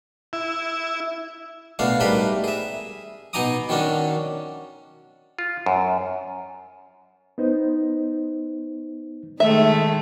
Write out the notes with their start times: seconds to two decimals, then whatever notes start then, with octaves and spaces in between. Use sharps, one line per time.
0.33 E4
1.79 B2 A3 D4 F5
2.00 G#2 G3 A3 A#4 B4 B5
2.44 G#4 E5
3.33 B2 D#4 G#5 A#5 D6 D#6
3.69 D#3 F#3 C#4 D4
5.39 F4
5.66 F#2
7.38 B3 D#4 C5
9.40 D#3 G#3 A3 E5